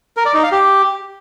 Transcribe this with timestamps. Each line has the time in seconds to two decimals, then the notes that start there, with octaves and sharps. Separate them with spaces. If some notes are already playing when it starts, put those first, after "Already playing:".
0.17 A#4
0.26 D5
0.34 D#4
0.43 F5
0.52 G4